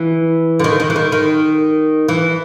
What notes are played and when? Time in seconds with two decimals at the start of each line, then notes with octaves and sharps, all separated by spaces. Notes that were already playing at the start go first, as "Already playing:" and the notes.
Already playing: E3
0.59 D3
0.64 D#3
0.80 D#3
0.90 E3
0.96 D#3
1.12 D#3
2.09 E3